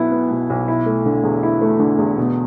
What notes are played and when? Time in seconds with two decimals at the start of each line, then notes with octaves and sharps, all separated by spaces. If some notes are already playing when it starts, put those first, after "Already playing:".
Already playing: B1 B2 B3 E4
0.11 B3
0.31 B2
0.50 B1
0.68 E4
0.86 A3
1.06 D3
1.23 E2
1.43 E4
1.61 A3
1.79 D3
1.98 E2
2.17 B2